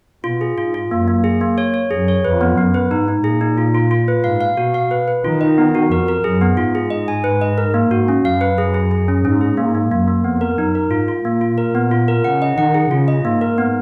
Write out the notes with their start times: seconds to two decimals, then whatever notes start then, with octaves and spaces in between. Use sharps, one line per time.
0.24 B2 F4
0.41 G#4
0.58 G#2 F4
0.74 F4
0.90 F#2 A#3
1.08 A#3
1.24 G#4
1.41 A#3
1.58 C#5
1.74 C#5
1.90 F#2 G#4
2.08 C#5
2.25 F2 B4
2.41 B3
2.58 F#2 B3
2.74 B4
2.91 G#2 D#4
3.08 D#4
3.24 A#2 G#4
3.41 D#4
3.58 F4
3.74 F4
3.91 F4
4.08 B4
4.24 G#2 F5
4.41 F5
4.57 B2 F#4
4.74 F5
4.91 B4
5.08 B4
5.24 D#3 F4
5.41 D#5
5.58 B3
5.75 F#4
5.91 F2 A#4
6.08 A#4
6.24 F#2 G#4
6.41 B3
6.57 G#2 F4
6.75 G#4
6.90 D#5
7.08 G#5
7.24 B4
7.41 D#5
7.58 A#4
7.74 A#3
7.91 G#2 F#4
8.08 C#4
8.24 F#2 F5
8.41 B4
8.58 F#2 G#4
8.74 G#4
8.91 G#4
9.08 C#4
9.24 G#2 C#4
9.41 G#4
9.57 G#2 A#3
9.75 A#3
9.91 F#2 A#3
10.08 A#3
10.24 F2 B3
10.41 A#4
10.58 F#2 D#4
10.75 A#4
10.91 G#2 F4
11.08 F4
11.25 A#2 A#3
11.41 F4
11.58 A#2 A#4
11.75 B3
11.91 F4
12.08 A#4
12.24 C#3 F#5
12.42 D#5
12.58 D#3 F#5
12.74 G#4
12.91 C#3 F4
13.08 D#5
13.25 G#2 A#3
13.41 A#4
13.58 B3